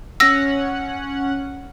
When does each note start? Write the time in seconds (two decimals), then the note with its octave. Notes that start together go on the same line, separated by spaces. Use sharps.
0.20 C#4 F#5 E6 A#6